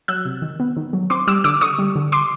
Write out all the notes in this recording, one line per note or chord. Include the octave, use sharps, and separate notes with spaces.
F#3 E6 F#6
C3
D#3
B3
D#3
F#3
C4 C6 D6
G3 D6 E6
D3 D6 E6
D3 C#6 D#6
G3
D3
C6 D6